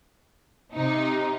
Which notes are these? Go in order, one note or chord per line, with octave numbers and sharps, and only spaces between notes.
C3 D#4